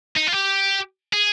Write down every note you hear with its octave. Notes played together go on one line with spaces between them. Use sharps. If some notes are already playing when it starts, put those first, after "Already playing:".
D#4
F4
G4
G#4